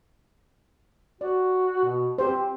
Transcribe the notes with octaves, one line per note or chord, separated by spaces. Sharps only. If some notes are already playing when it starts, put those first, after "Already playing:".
F#4 D5
B2
C4 G4 B4 C5